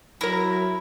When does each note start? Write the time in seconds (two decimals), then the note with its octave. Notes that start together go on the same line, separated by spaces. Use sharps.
0.21 F#3 E4 A#4 A#6